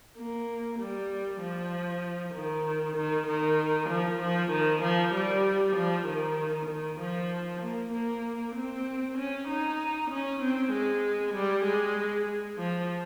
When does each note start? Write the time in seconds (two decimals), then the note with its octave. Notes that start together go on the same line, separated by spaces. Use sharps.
0.17 A#3
0.80 G3
1.41 F3
2.35 D#3
2.97 D#3
3.28 D#3
3.90 F3
4.21 F3
4.52 D#3
4.83 F3
5.14 G3
5.77 F3
6.07 D#3
6.70 D#3
7.00 F3
7.63 A#3
7.93 A#3
8.55 C4
9.18 C#4
9.48 D#4
10.11 C#4
10.42 C4
10.73 G#3
11.35 G3
11.66 G#3
12.59 F3